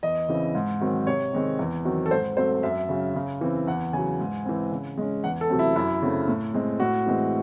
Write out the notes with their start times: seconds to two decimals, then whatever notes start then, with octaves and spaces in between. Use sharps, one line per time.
0.03 E2 D#5
0.29 C#3 E3 C4
0.55 G#2
0.80 D#3 F#3 C4
1.07 C3 C#5
1.33 D#3 G#3 C4
1.59 E2
1.85 D#3 F#3 C4
2.06 A4
2.11 G#2 C5
2.37 F#3 A3 C4 C5
2.63 F#2 E5
2.89 C#3 F#3 C#4
3.15 C#3
3.41 E3 C4
3.67 E2 F#5
3.93 C#3 F#3 G#5
4.20 G#2
4.45 E3 C4
4.71 C#3
4.98 G#3 C#4
5.24 E2 F#5
5.41 A4
5.50 C3 F#3 A3 C4
5.59 E4
5.76 F#2 E4
6.02 C#3 F#3 A3 C4
6.28 A2
6.54 G#3 C4
6.80 A2 F#4
7.06 E3 G#3 C4